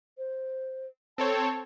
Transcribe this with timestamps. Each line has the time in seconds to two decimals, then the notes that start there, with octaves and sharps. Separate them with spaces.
0.18 C5
1.18 C4 A4 C#5 A5